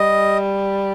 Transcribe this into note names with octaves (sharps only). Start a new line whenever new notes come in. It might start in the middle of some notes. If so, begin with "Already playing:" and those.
Already playing: G3 D#5